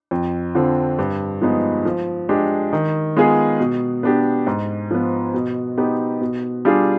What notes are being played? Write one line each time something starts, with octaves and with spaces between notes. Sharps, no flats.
F2
D3 F3 C4
G2
F3 G#3 B3 D#4
F3
G#3 D4 G4
D#3
G#3 B3 F4 G#4
B2
B3 D4 G4
G#2
F3 B3
B2
B3 D#4 G4
B2
G3 D4 F4 G#4